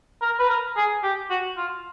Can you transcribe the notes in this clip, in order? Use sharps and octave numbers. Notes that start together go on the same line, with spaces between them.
A#4
B4
A#4
G#4
G4
F#4
F4